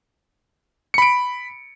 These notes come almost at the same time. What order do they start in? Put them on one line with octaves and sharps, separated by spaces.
C#7 B5 D7